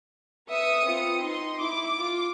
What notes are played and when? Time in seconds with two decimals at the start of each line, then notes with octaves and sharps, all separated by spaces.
0.49 B4 E5 D#6 C#7
0.84 C4 F4
1.22 D#4 C6
1.60 E4 D6
1.98 F4